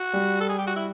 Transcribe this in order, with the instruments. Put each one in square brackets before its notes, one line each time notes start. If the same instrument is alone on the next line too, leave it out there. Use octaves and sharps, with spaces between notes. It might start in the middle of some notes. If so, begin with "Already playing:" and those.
Already playing: [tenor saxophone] F#4
[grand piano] G3
[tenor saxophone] A4
G#4
G4
F#4
E4